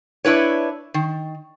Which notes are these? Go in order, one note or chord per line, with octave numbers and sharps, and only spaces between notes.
D4 E4 B4 C#5
D#3